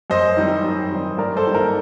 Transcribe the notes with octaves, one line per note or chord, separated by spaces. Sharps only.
F#2 C5 D#5
D#3 G3 C4 D#4
F#2
D#3 G3 C4 D#4
G2 A#4 D5
A4 C5
D#3 G3 A#3 D4
A#4